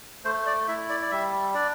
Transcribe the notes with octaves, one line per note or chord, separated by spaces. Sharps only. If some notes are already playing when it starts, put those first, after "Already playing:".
A3 C5
D5
E4 E5
D5
D5
G3 E5
D4 D5